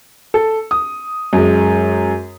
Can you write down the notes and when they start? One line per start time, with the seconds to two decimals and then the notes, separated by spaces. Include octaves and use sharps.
0.34 A4
0.71 D#6
1.33 F#2 G#3